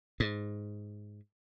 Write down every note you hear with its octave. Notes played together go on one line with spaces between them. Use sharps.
G#2